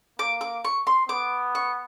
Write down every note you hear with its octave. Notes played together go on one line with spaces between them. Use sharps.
A#3 D6
D6
C#6
C6
B3 D6
C#6